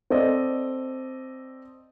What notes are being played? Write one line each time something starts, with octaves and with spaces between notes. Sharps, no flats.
C4 A4 D5 D#5